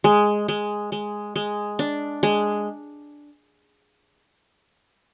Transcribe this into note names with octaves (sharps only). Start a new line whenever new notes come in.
G#3
G#3
G#3
G#3
D4
G#3